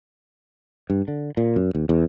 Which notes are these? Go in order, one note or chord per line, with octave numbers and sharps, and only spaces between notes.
G2
D3
A#2
F#2
D#2
E2